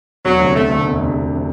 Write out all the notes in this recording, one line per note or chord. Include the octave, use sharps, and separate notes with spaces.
E1 F#3
D2 C3
E1 A3
D2 C3
E1
D2 C3
E1
C3